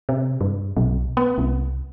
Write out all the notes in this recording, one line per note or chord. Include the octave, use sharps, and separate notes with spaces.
C3
G2
B1
B3
C2